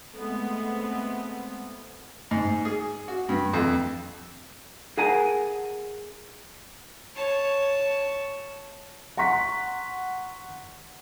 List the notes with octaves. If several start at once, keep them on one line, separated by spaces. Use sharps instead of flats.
G#3 A3 B3 C4
G#2
G#4
F#4
G2
F2
G#4 A#4 F#5 G#5 A#5
C#5 A5
F#5 A#5 C6 C#6 B6